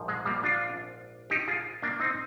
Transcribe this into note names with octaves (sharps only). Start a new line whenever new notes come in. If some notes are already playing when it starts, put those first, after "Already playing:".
Already playing: A#1 G#2 F3
G#3
G3 A#3
D4 F4
D#4 G4
F4 G#4
A#3 D4
C4 D#4